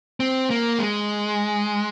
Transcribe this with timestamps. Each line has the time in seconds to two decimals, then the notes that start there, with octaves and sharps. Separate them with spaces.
0.20 C4
0.50 A#3
0.79 G#3